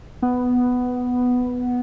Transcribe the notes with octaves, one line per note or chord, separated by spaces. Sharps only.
B3